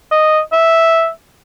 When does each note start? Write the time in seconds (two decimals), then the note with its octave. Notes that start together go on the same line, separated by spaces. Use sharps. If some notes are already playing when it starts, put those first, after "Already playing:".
0.11 D#5
0.52 E5